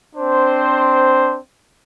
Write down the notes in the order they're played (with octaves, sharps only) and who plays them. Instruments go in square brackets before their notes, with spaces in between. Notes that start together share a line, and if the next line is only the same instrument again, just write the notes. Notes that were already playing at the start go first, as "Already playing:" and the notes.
[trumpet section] C4 D4 C5